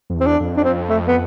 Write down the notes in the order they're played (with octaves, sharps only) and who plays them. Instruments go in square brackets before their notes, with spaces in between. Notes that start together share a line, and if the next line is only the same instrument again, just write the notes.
[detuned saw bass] F2
E2
[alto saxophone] C4
D4
[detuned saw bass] F2
[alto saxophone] D4
C4
A3
B3